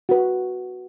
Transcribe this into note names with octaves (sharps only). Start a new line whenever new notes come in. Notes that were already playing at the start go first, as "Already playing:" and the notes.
F#4 B4